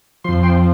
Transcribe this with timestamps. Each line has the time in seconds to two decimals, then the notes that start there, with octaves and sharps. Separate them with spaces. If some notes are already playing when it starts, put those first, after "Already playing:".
0.24 F2 F3 C6
0.43 G5 C6